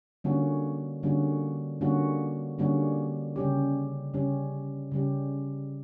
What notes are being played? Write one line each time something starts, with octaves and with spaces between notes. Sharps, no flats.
D3 G3 A#3 C#4 F#4
D3 G3 A#3 C#4 F#4
D3 G3 A#3 C#4 F#4
D3 G3 A#3 C#4 F#4
C#3 G3 C#4 G4
C#3 G3 C#4 G4
C#3 G3 C#4 G4